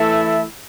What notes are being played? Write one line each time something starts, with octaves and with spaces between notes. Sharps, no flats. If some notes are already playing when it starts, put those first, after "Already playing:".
Already playing: E3 A3 E4 A4 E5